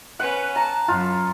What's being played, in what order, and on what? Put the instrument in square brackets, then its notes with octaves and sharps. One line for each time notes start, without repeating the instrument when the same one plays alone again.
[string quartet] C#4 B4 [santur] F#5
[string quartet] A5 [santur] A#5
[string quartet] F#2 [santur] F4